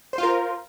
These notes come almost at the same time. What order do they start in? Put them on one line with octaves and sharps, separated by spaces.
C5 F4 A#4